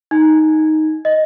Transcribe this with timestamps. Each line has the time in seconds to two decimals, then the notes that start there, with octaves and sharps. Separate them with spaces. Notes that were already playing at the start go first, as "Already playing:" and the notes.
0.11 D#4
1.05 D#5